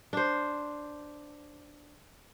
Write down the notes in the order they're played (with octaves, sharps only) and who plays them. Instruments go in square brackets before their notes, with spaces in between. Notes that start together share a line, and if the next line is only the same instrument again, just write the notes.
[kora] D4 C5